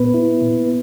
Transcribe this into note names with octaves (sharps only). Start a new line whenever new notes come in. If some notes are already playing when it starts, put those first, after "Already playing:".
Already playing: A#2 B3 B4
E4
A#2